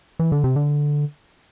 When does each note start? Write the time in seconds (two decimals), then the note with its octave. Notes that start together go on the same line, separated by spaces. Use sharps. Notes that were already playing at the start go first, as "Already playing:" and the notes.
0.19 E3
0.32 D3
0.44 C3
0.56 D3